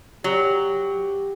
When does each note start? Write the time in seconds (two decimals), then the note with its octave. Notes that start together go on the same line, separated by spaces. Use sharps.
0.24 F#3 G4